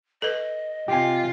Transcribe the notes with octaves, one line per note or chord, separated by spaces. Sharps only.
A4 B4 D#5
C3 F4 G4 G#5